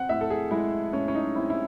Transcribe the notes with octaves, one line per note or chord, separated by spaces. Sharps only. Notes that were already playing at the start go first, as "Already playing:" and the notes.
Already playing: C4 F#5
A2 E5
A4
G#4
G#3 E4
A2 C#4
C#4
D#4
C4 E4
E4